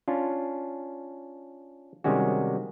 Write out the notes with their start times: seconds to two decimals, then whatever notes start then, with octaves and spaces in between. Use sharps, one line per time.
0.08 C#4 D4 F4
2.04 C3 D#3 G3 G#3 C#4 F#4